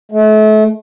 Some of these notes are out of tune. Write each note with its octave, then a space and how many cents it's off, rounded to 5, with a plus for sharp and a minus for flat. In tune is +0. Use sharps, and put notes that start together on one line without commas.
A3 -35